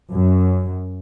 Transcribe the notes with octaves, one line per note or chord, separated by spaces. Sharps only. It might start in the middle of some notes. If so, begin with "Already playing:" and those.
F#2